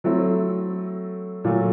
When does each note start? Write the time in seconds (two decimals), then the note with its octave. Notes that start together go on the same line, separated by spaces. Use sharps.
0.04 F#3 A3 C4 E4
1.44 A#2 F#3 A3